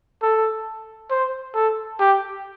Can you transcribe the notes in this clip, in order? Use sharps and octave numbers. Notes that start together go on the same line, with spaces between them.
A4
C5
A4
G4